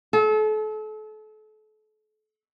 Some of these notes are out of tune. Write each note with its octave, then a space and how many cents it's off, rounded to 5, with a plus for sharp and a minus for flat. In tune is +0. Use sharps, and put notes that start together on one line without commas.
A4 -35